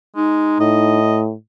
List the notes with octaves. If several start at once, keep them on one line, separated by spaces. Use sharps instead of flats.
G#3 D#4
A2 D#5